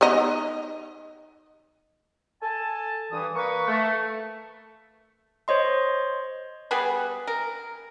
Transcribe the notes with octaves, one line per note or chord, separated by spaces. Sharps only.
B3 D#4 D#5
A4 G#5 A5
G2 E3 D#6
A#3 A#4 B4 C#6
A3
C5 C#5 D#5 C6
G3 B3 G#4 B4
A#4